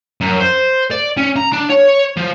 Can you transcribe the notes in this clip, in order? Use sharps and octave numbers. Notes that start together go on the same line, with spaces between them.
F#2
C5
D5
C#4
A#5
D4
C#5
F3